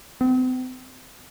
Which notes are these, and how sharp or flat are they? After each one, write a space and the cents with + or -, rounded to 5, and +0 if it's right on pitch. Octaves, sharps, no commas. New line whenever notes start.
C4 -40